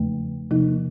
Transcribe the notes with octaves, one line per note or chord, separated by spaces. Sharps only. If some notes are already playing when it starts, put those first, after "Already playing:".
Already playing: E2 C#3 F3 A3
C3 F3 A#3 D#4